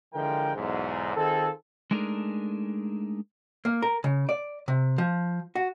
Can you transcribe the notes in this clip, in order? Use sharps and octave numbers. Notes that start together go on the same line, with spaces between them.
D3 E3 F3 G#3 A#4 G5
B1 E2 G#2
D#3 C4 F4 G#4 A4
G#3 A3 D4 D#4 G#4 A#4
A#3
A#4
C#3
D5
C3
F3
F#4